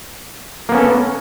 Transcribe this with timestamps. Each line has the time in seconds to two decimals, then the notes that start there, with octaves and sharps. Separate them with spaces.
0.69 A#3
0.72 B3
0.74 C#4
0.77 A4